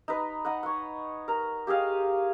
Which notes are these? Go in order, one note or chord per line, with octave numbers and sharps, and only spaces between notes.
D#4 B4 A#5
D#4 D#5 F#5
C#5 F#5
A#4 A#5
G4 G#4 D#5 F5